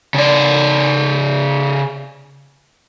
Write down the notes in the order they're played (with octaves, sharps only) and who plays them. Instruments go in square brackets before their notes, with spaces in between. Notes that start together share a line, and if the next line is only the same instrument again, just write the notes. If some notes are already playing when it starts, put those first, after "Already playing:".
[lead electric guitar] C#3 D5